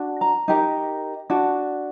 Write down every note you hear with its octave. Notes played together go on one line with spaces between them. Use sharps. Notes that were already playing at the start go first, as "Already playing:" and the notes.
Already playing: D4 F#4
A#5
D#4 G4 A#4
D4 F#4